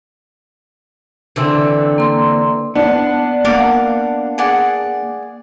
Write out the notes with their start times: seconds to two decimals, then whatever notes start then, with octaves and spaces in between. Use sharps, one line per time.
1.36 D3 E3 C4
1.98 A#3 C6
2.75 B3 D4
3.45 A#3 D5 F5 F#5
4.38 G#4 D5 F#5